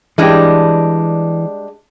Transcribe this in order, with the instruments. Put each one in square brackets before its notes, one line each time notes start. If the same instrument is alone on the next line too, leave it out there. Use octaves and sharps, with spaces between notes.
[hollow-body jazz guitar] E3 G4 [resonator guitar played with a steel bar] G3 G#3 D4